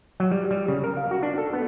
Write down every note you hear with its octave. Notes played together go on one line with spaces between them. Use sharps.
F#3
G3
G3
C#3
A#4
F5
F#4
D4
A4
B3